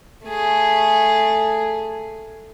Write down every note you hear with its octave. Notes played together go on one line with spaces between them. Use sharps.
A3 G#4